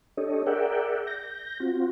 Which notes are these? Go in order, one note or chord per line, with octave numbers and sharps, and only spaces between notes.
D4 G4 A4 C#5 D#5
G#4 A#4 D5 E5 F#5 G5
G6 A#6
C4 F4 F#4